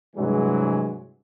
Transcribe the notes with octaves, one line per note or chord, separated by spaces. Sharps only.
G2 C3 E3 F#3 G#3